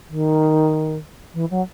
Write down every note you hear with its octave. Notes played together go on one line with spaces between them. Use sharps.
D#3
E3
F#3